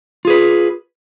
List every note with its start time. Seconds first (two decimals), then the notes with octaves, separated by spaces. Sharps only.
0.25 F4
0.27 G#4
0.30 B4